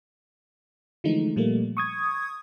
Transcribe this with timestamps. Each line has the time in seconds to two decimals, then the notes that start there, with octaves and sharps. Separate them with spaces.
1.04 D3 E3 F3 G#3 A3 D#4
1.36 A#2 F3 G3 A3 A#3
1.77 C#6 D#6 G#6